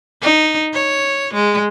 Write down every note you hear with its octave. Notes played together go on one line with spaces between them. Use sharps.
D#4
C#5
G#3